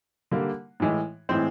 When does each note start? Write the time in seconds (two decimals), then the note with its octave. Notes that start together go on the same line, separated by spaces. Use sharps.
0.31 D3 G3 A#3
0.80 A2 E3 G#3
1.29 A2 E3 G#3 C4 C5